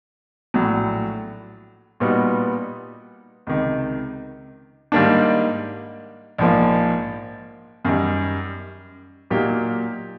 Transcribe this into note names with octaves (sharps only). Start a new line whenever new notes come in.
A#1 A2 F#3
A#2 G3 B3 D#4 F#4
C#2 C3 D#3
G#2 D#3 G3 A#3 D4
A#1 G#2 F3 A#3
F#2 D#3 G3
A#2 F#3 A#3 D#4 G4